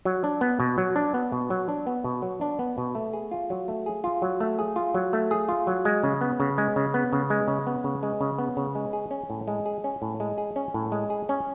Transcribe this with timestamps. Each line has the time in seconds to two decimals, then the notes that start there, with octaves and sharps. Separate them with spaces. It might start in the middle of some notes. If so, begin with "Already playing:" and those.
0.05 F#3
0.24 D4
0.41 B3
0.60 B2
0.78 F#3
0.96 D4
1.14 B3
1.32 B2
1.50 F#3
1.69 D4
1.87 B3
2.04 B2
2.22 F#3
2.41 D4
2.59 B3
2.78 B2
2.95 A3
3.13 G#4
3.31 F4
3.50 F#3
3.68 A3
3.86 G#4
4.04 F4
4.22 F#3
4.40 A3
4.59 G#4
4.76 F4
4.94 F#3
5.13 A3
5.31 G#4
5.49 F4
5.67 F#3
5.85 G#3
6.03 C#3
6.21 B3
6.40 C#3
6.58 G#3
6.76 C#3
6.94 B3
7.13 C#3
7.30 G#3
7.48 C#3
7.67 B3
7.84 C#3
8.03 G#3
8.21 C#3
8.38 B3
8.57 C#3
8.75 G#3
8.93 G#4
9.11 C#4
9.30 A2
9.48 G#3
9.66 G#4
9.84 C#4
10.02 A2
10.20 G#3
10.38 G#4
10.56 C#4
10.74 A2
10.92 G#3
11.10 G#4
11.29 C#4